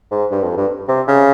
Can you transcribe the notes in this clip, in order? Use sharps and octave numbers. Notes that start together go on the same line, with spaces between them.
G#2
G2
F2
G2
C3
C#3